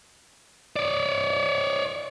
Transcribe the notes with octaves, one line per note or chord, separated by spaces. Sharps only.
C#5 D5